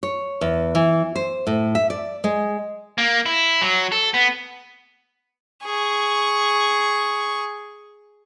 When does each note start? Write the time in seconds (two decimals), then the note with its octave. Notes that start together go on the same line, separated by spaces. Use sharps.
0.03 C#5
0.41 E2
0.75 E3
1.16 C5
1.47 A2
1.75 E5
1.90 D5
2.24 G#3
2.98 A#3
3.26 E4
3.62 F#3
3.92 A4
4.14 B3
5.65 G#4 C#6